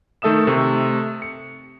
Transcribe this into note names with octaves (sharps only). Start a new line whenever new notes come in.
D#3 A3 A4 E5 D#6 E7
C3 A3 C#6
C#7